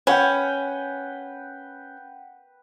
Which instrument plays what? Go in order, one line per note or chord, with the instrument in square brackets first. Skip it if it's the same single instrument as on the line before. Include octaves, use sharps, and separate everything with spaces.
[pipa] C#4 [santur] B4 F#5 G5